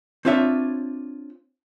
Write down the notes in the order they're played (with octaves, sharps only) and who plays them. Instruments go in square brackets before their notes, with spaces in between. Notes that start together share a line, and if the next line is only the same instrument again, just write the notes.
[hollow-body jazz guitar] C4 D4 F4 C#5 E5